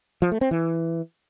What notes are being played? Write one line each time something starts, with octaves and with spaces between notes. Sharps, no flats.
F3
A3
C4
E3